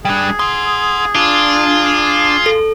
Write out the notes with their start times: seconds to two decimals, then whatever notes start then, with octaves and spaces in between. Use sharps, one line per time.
0.05 G3 D4 G#4
0.39 F#5 C6 D#6
1.15 D4 F4
2.46 A4